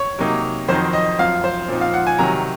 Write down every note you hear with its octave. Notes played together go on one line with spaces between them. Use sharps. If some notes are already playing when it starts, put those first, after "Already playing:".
Already playing: C#5
C3 F#3 A#3 D#4
F2 D#3 F#3 C4 D#4 C5
D#5
F#2 F3 C4 F5
C5
A#2 F3 C4 D#4
F5
F#5
G#5
C3 D#3 F#3 A#5